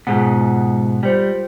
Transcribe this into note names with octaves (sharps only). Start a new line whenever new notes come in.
G#2 B2 F4 G#4 F#5
G3 F4 C5 G5